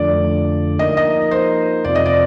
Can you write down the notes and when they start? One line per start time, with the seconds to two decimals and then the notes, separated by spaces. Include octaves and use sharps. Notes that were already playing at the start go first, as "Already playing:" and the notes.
Already playing: F2 D3 F3 A3 D4 D5
0.79 F3 A#3 D#4 A#4 D#5
0.97 D#5
1.31 C5
1.84 F2 C3 F3 C4 F4 D5
1.95 D#5
2.05 D5